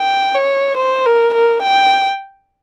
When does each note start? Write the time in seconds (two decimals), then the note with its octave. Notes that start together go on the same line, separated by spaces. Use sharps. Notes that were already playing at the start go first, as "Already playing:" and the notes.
Already playing: G5
0.35 C#5
0.77 C5
1.06 A#4
1.34 A#4
1.62 G5